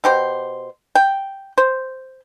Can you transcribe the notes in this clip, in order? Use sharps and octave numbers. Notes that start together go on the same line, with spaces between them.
B2 G4 C5
G5
C5